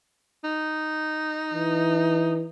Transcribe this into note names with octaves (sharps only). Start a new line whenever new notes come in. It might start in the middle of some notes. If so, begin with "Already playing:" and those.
D#4
E3